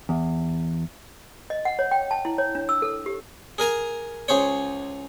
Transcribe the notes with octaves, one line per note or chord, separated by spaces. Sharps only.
E2
D#5
F#5
C#5
G5
A5
E4
C#5
D4
E6
A4
G4
G#4 A#4 G#5 A#5
C#2 G#4 C5 C#5